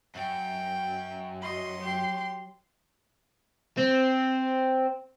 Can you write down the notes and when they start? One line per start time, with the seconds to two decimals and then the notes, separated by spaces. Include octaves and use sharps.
0.15 F#2 G5
1.43 F#3 D#5 C6
1.81 G4
3.77 C4